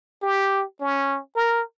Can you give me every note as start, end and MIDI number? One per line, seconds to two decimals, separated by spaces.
0.22 0.64 67
0.80 1.19 61
1.36 1.62 70